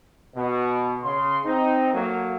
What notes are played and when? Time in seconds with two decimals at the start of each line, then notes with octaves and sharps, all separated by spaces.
0.36 B2
1.03 C#3 C6
1.44 C4 D#4
1.93 F#3 A3 A#3